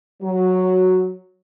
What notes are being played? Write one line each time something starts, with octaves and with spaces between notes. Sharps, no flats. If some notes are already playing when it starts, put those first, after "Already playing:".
F#3